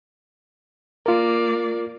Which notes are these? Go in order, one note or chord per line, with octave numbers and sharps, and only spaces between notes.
A#3 F4 A#4 D5